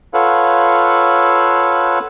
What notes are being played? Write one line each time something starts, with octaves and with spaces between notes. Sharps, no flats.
F4 A4 B4 C#5 F5 F#5